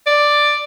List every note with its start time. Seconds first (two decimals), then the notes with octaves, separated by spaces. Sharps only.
0.07 D5